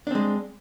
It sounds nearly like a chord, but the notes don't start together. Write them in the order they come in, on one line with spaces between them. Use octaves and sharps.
D4 C4 G#3